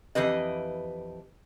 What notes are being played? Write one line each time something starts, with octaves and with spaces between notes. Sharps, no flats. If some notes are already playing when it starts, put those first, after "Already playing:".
F2 E3 G4 B4 D#5